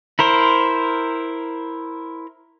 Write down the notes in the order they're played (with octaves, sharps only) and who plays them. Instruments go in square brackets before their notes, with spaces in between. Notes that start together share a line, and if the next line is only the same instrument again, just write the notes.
[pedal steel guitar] E4 A#4 C5